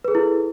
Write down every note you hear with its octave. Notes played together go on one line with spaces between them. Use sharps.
E4 G#4 A4 B4